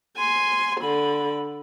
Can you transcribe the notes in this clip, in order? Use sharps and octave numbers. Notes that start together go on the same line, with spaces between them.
G#5 C6
D3 B5